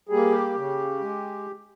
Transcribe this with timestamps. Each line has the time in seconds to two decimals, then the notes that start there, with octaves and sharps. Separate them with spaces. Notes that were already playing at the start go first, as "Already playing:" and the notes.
0.09 G3 A#3 G#4
0.32 G4
0.55 C#3
1.01 G#3